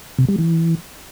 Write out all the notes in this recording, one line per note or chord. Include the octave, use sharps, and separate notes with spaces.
C3
G3
E3